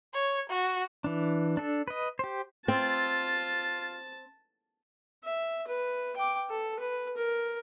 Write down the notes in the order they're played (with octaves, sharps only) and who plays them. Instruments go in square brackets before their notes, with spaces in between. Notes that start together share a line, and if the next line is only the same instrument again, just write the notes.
[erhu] C#5
F#4
[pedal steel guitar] E3 D4
D4 A4
B4 D#5
G4 C5
[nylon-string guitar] C4 [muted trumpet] F4 [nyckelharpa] A5
[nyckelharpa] E5
B4
G5 D6
A4
B4
A#4